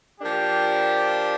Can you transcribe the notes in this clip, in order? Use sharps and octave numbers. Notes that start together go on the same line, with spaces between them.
F3 A#3 D4 G4